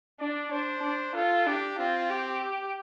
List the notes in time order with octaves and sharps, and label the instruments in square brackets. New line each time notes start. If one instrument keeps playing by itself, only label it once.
[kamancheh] D4 [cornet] D5
[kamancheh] D4 [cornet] C5
[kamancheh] D4
[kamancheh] F4 [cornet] A4
[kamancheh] D4 [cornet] G4
[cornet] C4 [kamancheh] F4
[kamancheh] G4